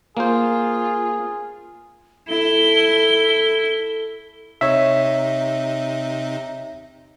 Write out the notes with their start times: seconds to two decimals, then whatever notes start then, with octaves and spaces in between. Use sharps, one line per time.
0.17 A#3 F4 G#4 C5
2.28 E4 A4 G7
4.61 C3 D#4 C#5 E5